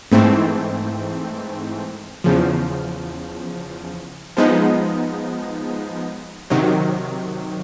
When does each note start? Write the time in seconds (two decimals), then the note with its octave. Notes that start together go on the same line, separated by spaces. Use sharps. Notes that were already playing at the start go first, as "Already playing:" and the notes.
0.12 G#2 E3 A3 C4
2.24 E2 C#3 F3
4.37 F3 G#3 B3 D#4
6.50 C3 D#3 F#3